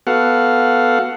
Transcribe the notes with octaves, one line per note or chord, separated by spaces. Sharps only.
B3 F#4 A4 F5 F#5